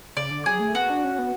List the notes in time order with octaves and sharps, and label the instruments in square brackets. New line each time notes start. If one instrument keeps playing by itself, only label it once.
[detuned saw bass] C#3 [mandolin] D5
[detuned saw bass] D3
[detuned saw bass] F#3 [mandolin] G#4
[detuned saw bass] A3
[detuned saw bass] B3 [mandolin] F#4
[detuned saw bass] D4
C#4
B3